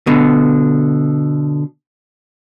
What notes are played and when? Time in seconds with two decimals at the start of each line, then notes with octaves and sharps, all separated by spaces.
0.07 B2 D3